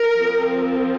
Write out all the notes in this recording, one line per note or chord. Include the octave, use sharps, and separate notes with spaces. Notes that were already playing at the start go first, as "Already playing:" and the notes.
Already playing: A#4
F3 C4